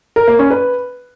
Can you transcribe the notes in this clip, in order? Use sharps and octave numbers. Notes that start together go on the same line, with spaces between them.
A#4
A#3
C#4
B4